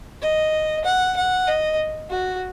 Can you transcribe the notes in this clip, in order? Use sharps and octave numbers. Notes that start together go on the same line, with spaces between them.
D#5
F#5
F#5
D#5
F#4